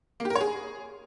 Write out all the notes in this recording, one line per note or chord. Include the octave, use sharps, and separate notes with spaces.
A#3
G4
A#4
C#5
G#4